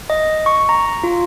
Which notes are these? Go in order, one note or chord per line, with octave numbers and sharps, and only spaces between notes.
D#5
C#6
A#5
F4